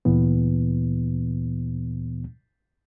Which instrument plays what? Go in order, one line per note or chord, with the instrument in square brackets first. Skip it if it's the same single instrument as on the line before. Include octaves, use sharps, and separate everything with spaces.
[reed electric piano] D2 A#2 E3 B3